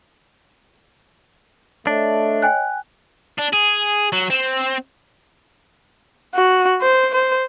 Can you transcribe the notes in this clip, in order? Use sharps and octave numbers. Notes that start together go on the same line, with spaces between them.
A3 D4 C#5 D#5
G5 G#5 F#6
D4
G#4
F#3
C4
F#4
C5
C5